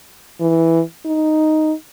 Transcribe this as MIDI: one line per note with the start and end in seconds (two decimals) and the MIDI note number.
0.40 0.81 52
1.06 1.73 63